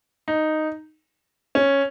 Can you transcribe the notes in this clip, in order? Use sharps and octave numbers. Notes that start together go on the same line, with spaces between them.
D#4
C#4